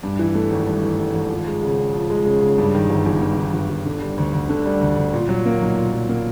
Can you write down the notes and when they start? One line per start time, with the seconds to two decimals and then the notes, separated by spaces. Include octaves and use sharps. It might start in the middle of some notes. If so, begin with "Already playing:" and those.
0.03 G2
0.19 E3
0.35 A3
0.51 G#1
0.67 G2
0.83 E3
0.99 A3
1.15 G#1
1.30 F3
1.47 G#3
1.63 C#3
1.78 C#3
1.94 F3
2.10 G#3
2.26 C#3
2.42 C#3
2.58 G2
2.75 D#3
2.90 G1
3.06 G1
3.22 G2
3.38 D#3
3.54 G1
3.70 G1
3.86 D3
4.01 G3
4.18 D2
4.33 D2
4.49 D3
4.66 G3
4.81 D2
4.97 D2
5.14 A#2
5.29 F#3
5.46 A#3
5.61 B1
5.77 A#2
5.92 F#3
6.09 A#3